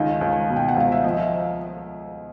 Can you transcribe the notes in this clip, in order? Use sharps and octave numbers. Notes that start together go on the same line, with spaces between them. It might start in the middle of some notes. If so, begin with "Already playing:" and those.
Already playing: C#2 D#3 D#5
C#2
B2
G5
F#5
C#2 F5
E5
F3 D#5
E5